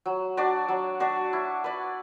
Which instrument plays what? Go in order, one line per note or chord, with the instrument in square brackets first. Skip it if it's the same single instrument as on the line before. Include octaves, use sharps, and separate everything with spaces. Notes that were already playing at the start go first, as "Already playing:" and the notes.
[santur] F#3
D4 F#4 D5
F#3
D4 F#4 D5
E4
B4 D5